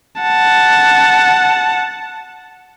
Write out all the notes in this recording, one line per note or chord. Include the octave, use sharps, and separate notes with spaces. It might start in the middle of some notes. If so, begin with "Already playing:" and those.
F#5 A5